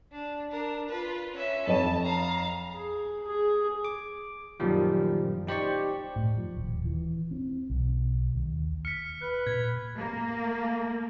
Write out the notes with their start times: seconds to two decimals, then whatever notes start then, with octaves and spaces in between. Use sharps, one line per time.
0.12 D4
0.51 D4 A#4
0.90 F4 B4
1.33 C#4 E5
1.67 F2 C#5 A5 D#7
2.03 F5 A#5
2.74 G#4
3.28 G#4
3.85 D6
4.60 F#2 A#2 D#3 F3 G3
5.47 D#4 G4 C5 D5 C#6
6.16 A2
6.37 F3
6.56 D#1
6.85 E3
7.31 C4
7.70 B1
8.35 D#2
8.85 F6 B6 C#7
9.22 B4 F#6
9.47 A#2 G#6 B6
9.99 A#3